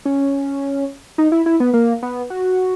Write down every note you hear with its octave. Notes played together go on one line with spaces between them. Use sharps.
C#4
D#4
E4
E4
B3
A#3
B3
F#4